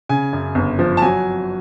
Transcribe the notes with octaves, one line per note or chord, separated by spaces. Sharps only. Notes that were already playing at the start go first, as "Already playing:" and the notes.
C#3 G#5
F#2
G1
F3
A5
F#3 G#5